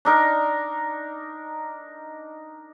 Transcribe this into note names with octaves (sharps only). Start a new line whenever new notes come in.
D4 D#4 A#4